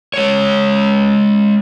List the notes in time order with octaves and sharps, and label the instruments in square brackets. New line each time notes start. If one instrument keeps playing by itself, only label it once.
[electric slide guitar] G#3 C#5